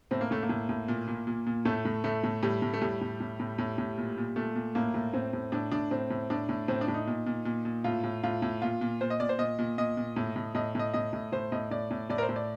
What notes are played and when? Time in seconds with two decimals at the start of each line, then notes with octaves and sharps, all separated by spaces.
0.11 A2 C4
0.21 A#3
0.31 A2 A3
0.42 A#3
0.49 A2
0.69 A2
0.88 A#2
1.08 A#2
1.27 A#2
1.46 A#2
1.65 A2 A3
1.85 A2
2.04 A2 A3
2.24 A2
2.42 A2 G3
2.62 A2
2.74 A3
2.81 A2 G3
3.01 A2
3.20 A2
3.40 A2
3.58 A2
3.78 A2
3.98 A#2
4.18 A#2
4.36 A#2 A3
4.55 A#2
4.75 A2 A#3
4.94 A2
5.13 A2 C4
5.33 A2
5.52 A2 D4
5.71 A2 D4
5.91 A2 C4
6.10 A2
6.30 A2 D4
6.49 A2
6.68 A2 C4
6.81 D4
6.88 A2
6.94 D#4
7.07 A#2
7.26 A#2
7.45 A#2
7.65 A#2
7.84 A2 F4
8.04 A2
8.24 A2 F4
8.42 A2
8.62 A#2 F4
8.81 A#2
9.01 A#2 C5
9.10 D#5
9.20 A#2 D5
9.29 C5
9.38 A#2 D#5
9.59 A#2
9.78 A#2 D#5
9.97 A#2
10.16 A2
10.36 A2
10.55 A2 D#5
10.75 A2 D#5
10.94 A2 D#5
11.13 A2
11.32 A2 C5
11.52 A2 D#5
11.71 A2 D5
11.91 A2
12.10 A2 D5
12.18 A#4
12.23 C5
12.29 A2
12.36 D5